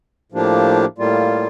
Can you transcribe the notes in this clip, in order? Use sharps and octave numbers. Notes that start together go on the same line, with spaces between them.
A2 F3 A#3 D4 G4
A2 G3 A#3 F4